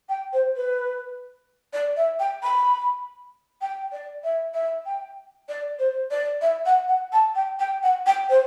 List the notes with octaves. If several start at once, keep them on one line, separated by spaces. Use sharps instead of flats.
G5
C5
B4
D5
E5
G5
B5
G5
D5
E5
E5
G5
D5
C5
D5
E5
F#5
F#5
A5
G5
G5
F#5
G5
C5